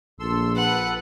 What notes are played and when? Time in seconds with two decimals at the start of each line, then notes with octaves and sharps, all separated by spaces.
0.20 A#1 A4 C6 E6
0.56 A4 B4 F#5